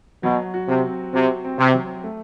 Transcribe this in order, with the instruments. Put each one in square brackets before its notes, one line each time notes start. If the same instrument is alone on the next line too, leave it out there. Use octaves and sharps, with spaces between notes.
[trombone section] B2 [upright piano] F#3
[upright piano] F#4
[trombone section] C3
[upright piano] C4
[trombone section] C3 [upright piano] F#4
[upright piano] C4
[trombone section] C3
[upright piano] F#3
A3